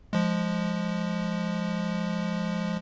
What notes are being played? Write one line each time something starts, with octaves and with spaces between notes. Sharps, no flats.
F3 G#3